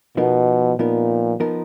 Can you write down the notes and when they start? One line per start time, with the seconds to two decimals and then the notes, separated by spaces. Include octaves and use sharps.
0.17 B2 F3 B3 D#4 A#4
0.79 A#2 F3 B3 D#4 A#4
1.40 F3 B3 D#4 A#4